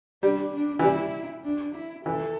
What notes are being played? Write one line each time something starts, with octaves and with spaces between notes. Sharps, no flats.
G3 D4
D4
E3
G3 E4
D4
E4
E3 A4